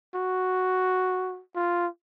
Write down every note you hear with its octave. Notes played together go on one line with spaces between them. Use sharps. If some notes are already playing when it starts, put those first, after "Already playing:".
F#4
F4